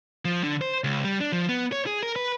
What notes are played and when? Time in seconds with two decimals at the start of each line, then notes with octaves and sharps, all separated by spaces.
0.25 F3
0.44 D3
0.61 C5
0.84 C#2
1.04 G3
1.21 D4
1.32 F3
1.49 B3
1.72 C#5
1.86 G#4
2.03 A#4
2.16 B4